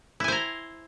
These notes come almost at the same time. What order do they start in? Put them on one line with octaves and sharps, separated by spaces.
E4 G#5 C5 A#5